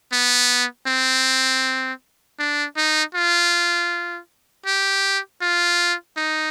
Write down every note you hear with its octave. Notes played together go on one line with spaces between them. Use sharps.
B3
C4
D4
D#4
F4
G4
F4
D#4